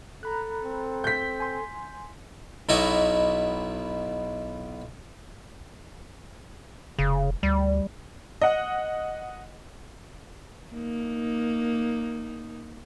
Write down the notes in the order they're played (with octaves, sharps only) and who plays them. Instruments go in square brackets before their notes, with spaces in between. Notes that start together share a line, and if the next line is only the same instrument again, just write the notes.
[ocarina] A4 [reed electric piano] A#5 B5 F#6
[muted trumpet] C4
[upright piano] G6 B6
[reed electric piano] G#5 C6
[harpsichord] B1 B2 E4 D#5 C#6 D6
[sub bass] F1 [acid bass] C#3
[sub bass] D2 [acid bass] G3
[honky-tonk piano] D#5 F#5
[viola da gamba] A#3 D#4